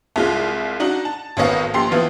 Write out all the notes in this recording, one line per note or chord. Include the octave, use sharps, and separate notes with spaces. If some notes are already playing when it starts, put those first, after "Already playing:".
C2 G#3 F4
D4 D#4 F#4
A5
G#1 D2 B3 C#5 D#5 F5
A#1 G4 C6 C7
E3 F3 B3 E4 F4